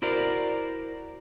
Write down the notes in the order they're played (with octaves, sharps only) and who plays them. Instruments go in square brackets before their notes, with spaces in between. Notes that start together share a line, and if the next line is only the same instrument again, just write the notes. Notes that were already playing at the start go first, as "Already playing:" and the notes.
[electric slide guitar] E4 F#4 A#4 C5 D5